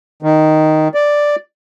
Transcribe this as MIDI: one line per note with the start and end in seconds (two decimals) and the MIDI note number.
0.22 0.88 51
0.94 1.36 74